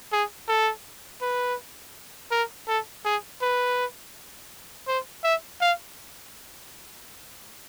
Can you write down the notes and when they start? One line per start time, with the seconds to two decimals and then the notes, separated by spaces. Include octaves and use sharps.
0.12 G#4
0.48 A4
1.22 B4
2.31 A#4
2.68 A4
3.05 G#4
3.42 B4
4.87 C5
5.24 E5
5.61 F5